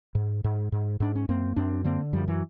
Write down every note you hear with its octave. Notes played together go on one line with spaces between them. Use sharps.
G#2
G#2
G#2
G#2 D4
C#4
F#2 A#3 C4
F#2 C4 D4
D3 A#3 C4
F#2 F3 G3
E3 F#3